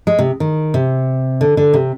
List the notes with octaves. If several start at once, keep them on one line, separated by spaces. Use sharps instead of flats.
G#3
C3
D#3
C3
D3
D3
C3